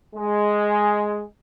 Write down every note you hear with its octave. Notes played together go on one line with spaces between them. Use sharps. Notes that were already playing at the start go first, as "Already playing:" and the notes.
G#3